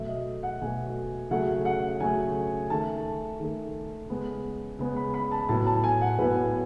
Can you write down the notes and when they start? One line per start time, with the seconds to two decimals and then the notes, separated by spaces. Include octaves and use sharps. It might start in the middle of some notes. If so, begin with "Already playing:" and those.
Already playing: B2 F#3 A3 E5
0.09 D#5
0.43 F#5
0.61 B2 F#3 A3 G#5
1.31 C#3 F#3 A3 F#5
1.65 F#5
2.00 C#3 F#3 A3 G#5
2.70 D#3 A3 A5
3.40 D#3 A3
4.09 C#3 G#3 B3
4.79 C#3 G#3 B3
4.96 B5
5.14 B5
5.32 A5
5.49 A2 F#3 B3 A5
5.67 A5
5.84 G#5
6.01 F#5
6.19 A2 F#3 B3 B4